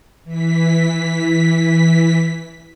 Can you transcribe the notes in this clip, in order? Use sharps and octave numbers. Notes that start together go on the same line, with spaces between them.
E3 B6